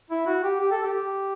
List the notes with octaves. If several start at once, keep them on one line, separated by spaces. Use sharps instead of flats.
E4
F#4
G4
G4
A4
G4